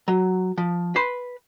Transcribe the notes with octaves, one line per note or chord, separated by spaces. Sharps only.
F#3
F3
B4 C6